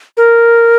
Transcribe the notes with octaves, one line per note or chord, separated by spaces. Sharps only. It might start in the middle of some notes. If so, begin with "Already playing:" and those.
A#4